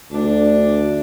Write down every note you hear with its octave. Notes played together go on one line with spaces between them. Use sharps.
D2 D4